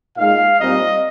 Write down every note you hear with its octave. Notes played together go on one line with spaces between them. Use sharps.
A#2 G#3 D#4 F5
A#2 G3 C4 D#4 D#5